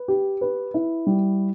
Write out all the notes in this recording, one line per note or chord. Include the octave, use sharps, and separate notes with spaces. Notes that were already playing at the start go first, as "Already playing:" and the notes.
Already playing: B4
G4
B4
E4
G3